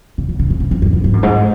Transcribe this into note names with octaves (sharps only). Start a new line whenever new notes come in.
C#3
C#3
C#3
A2
G#2
F2
F#2
F#2
G#2
F#2
G#2